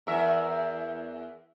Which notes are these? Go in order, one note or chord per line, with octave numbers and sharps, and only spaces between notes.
E2 A#4 E5